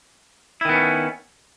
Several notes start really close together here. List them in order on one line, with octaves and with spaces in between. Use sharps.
E4 D#3 B3 C#4